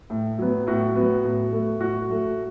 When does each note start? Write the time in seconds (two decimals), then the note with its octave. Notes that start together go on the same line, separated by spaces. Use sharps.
0.10 A2
0.38 F#3 B3
0.67 A2 F#4
0.95 F#3 B3
1.24 A2
1.52 F#3 A3
1.80 A2 F#4
2.09 F#3 A3